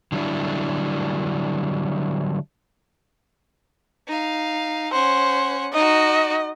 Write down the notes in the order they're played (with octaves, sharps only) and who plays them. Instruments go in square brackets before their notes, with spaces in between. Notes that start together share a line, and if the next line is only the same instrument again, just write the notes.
[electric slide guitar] D3 F#3 G3 D4 E4
[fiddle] D#4 F5
[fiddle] C#4 F#5 [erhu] C5
[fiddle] D#4 F#4 [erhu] D#5